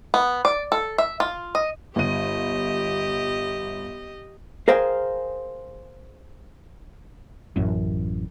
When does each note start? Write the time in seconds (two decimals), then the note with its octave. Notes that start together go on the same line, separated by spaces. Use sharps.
0.14 B3
0.45 D5
0.72 A4
0.98 E5
1.20 F4
1.55 D#5
1.96 G1 G4 D#5 D#7
4.68 G#4 A#4 C5 F5 G5 G#5
7.56 A1 F#2